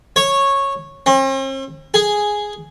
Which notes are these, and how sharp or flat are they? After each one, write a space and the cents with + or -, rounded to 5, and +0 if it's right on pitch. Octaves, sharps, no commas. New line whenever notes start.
C#5 -10
C4 +45
G#4 +0